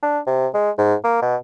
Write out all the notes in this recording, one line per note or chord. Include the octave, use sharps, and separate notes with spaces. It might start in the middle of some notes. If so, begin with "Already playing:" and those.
D4
C3
G#3
G#2
A#3
B2